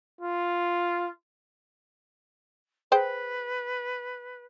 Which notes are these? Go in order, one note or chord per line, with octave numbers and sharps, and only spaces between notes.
F4
G#4 B4 C5 G5